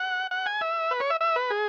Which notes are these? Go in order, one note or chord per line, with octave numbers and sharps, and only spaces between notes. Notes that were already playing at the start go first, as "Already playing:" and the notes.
Already playing: F#5
F#5
G#5
E5
B4
C#5
E5
E5
B4
G#4